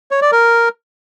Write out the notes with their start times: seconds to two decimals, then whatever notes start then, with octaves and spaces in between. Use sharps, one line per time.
0.11 C#5
0.22 D5
0.32 A#4